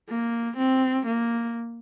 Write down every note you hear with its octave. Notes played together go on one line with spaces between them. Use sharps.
A#3
C4
A#3